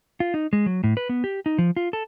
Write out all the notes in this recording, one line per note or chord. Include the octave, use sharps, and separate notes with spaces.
F4
D#4
G#3
F#3
A2
B4
B3
G4
D#4
F3
F4
A4